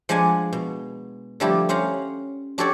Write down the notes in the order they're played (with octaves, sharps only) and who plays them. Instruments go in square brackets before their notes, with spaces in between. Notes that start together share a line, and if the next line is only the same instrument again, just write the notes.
[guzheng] F3 G#3 D4 F#5 G#5
B2
D3 F3 G3 A3 E4 G4
C#4 C5 F5 F#5 A#5
D4 F#4 G4 A4 C#5 D5